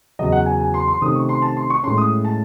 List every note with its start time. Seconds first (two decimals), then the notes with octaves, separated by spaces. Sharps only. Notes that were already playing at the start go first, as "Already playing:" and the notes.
0.19 E2 C#3 F#3 D#5
0.32 F#5
0.46 G#5
0.61 G#5
0.74 C6
0.88 C6
1.02 C3 D#3 A3 C#4 D#6
1.16 C#6
1.29 C6
1.42 A5
1.57 C6
1.70 C#6
1.83 A2 G#3 C#4 C6
1.98 D#6
2.25 A5